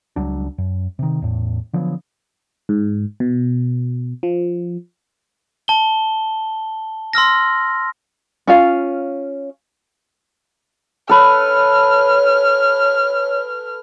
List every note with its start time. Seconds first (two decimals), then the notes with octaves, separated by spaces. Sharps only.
0.16 C#2 F#3 G3 D4
0.58 F#2
0.99 C3 D#3
1.22 E2 A2
1.73 D3 F3 F#3 B3
2.69 G#2
3.20 B2
4.23 F3
5.68 A5 G7
7.13 C6 E6 F6 A#6
8.47 C#4 F4 F5
11.09 A4 B4 C#5 F6